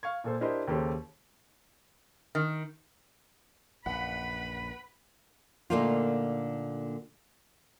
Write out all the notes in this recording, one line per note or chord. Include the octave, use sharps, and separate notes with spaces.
F5 C#6 G#6
A#2 A4 C5
D4 E4 G4 A#4 C5 D#5
D#2 C#3 G4 A4 C5 C#5
D#3
A#1 F#2 B4 F#5 B5
A#2 D3 A3 A#3 D#4 F4